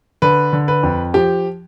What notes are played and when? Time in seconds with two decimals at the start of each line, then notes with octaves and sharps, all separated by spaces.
0.22 D3 B4
0.53 D3
0.68 B4
0.83 F2
1.14 F3 G4